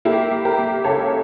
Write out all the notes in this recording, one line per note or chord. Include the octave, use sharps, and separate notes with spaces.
A#3 E4 G4
A#3
G4 A#4
A#3
C#2 A4 C#5